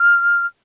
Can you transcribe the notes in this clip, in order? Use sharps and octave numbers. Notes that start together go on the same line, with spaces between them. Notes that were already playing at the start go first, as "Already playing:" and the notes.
Already playing: F6